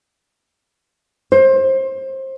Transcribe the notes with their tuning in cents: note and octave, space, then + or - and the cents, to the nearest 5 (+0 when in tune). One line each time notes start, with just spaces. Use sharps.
C5 +25